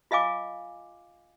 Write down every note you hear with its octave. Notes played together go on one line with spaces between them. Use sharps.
F4 D#5 F5 G#5 D6